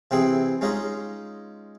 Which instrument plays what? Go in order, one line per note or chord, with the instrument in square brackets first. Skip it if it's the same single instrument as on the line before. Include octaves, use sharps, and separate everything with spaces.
[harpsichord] C3 E3 C4 E4 G#4
G#3 C#4 D#4 F4 G#4 D#5